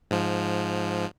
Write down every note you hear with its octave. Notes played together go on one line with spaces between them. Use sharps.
G#2 F3